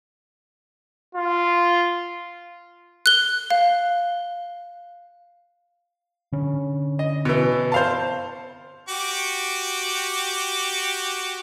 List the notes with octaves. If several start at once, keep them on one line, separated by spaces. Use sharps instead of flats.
F4
F#6 G7
F5
D3 C#4
D#5
B2 E3
C5 F5 A5
F#4 G4 D6